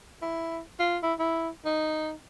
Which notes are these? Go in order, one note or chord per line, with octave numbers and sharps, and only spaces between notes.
E4
F4
E4
E4
D#4